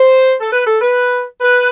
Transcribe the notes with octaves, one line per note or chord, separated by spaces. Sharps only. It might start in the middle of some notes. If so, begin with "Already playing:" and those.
Already playing: C5
A4
B4
A4
B4
B4